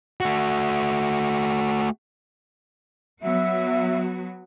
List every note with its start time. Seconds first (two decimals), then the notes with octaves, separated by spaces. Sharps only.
0.21 A3 F#4
3.22 F#3 B3 F#4 E5